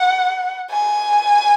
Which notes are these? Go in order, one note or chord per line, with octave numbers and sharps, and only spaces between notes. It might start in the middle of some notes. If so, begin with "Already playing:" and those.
Already playing: F#5
G#5